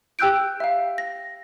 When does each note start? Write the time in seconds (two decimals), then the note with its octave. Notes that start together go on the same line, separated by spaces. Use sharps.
0.19 G4 G5 E6 F#6 G6 D7
0.60 E5 F5
0.98 A#6